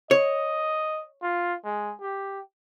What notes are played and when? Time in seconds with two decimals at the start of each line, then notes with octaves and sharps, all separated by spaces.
0.11 C#5 D#5
1.22 F4
1.65 G#3
2.01 G4